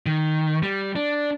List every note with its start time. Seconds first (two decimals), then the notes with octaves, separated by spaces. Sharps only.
0.06 D#3
0.63 G3
0.96 D4